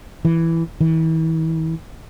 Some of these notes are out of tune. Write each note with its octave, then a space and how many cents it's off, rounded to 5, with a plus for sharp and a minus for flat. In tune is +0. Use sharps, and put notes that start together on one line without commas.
E3 +5
E3 -35